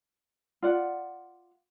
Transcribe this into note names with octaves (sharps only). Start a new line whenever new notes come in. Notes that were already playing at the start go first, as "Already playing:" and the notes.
F4 D5 F#5